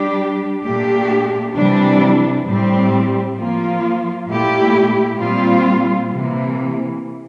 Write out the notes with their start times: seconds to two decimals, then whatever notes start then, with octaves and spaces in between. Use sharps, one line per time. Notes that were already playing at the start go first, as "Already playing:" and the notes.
Already playing: G3 D4 G4
0.63 A#2 A3 D4 G4
1.54 C3 E3 G3 D4
2.45 A2 G3 C4 G4
3.37 F3 A#3 F4
4.27 A#2 A3 E4 G4
5.18 A#2 G3 C4 F4
6.10 C3 E3 A#3